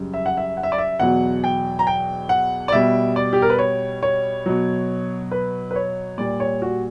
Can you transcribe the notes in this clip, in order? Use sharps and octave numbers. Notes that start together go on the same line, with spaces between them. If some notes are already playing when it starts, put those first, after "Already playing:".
Already playing: F#2 C#3 G3
E5
F#5
E5
F#5
E5
D5
E5
E2 B2 F#3 F#5
G5
A#5
G5
F#5
D5
B2 G3 E5
D5
G4
A#4
B4
C#5
C#5
B2 F#3
B4
B4
C#5
A#2 G3 D5
C#5
F#4